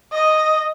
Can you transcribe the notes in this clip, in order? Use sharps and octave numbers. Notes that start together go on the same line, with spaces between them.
D#5